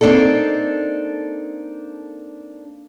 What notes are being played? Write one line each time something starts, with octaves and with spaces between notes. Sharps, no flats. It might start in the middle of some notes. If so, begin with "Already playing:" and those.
A#3 C4 D4 D#4 A4